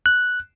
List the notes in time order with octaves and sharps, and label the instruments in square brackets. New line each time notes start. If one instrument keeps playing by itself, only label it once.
[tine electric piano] F#6